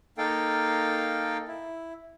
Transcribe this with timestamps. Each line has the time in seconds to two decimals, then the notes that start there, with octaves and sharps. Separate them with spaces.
0.18 A#3 D#4 A4 F5 G5
1.48 E4